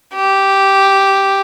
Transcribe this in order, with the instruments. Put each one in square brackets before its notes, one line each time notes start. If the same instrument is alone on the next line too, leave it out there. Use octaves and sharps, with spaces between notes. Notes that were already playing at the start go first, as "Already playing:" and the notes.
[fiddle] G4